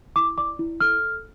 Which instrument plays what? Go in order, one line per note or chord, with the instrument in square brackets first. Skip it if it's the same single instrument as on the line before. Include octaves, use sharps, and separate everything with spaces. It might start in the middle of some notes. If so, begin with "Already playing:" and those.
[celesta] E4 D6
D5 D6
E4
A4 F6